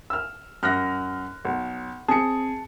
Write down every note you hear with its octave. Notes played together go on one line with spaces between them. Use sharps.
E6 F6
F#2 F6 F#6 A#6
B1
C4 G#4 A5 C#7